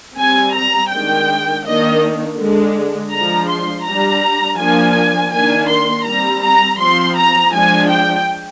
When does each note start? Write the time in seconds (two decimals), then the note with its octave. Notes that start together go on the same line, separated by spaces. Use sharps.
0.18 G3 C4 G#5
0.55 A#5
0.91 D#3 G#3 D4 G5
1.64 D#3 A#3 D4 D#5
2.38 D3 G#3 D4
3.12 F3 G#3 D4 A#5
3.49 C6
3.85 G3 D4 A#5
4.59 F3 A#3 D4 G#5
5.32 D#3 A#3 D4 G#5
5.69 C6
6.05 G3 C4 A#5
6.43 A#5
6.79 F3 C4 C6
7.16 A#5
7.53 F3 G#3 D4 G#5
7.89 G5